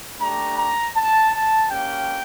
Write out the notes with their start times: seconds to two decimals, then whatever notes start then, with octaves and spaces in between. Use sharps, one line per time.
0.19 A3 D4 G4 A#5
0.57 A#5
0.95 A5
1.32 A5
1.70 A#3 C#4 G4 G5